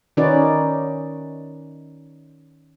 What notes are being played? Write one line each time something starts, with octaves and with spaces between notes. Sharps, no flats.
D#3 C#4 D#4 F#4 B4 D5